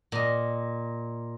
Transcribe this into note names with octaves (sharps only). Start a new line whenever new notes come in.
A#2 D#5